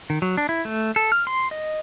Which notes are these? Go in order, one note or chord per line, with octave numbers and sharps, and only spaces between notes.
D#3
F#3
D4
E4
A3
A4
F6
C6
D#5